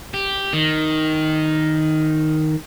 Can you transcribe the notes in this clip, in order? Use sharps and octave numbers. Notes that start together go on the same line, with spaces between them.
G4
D#3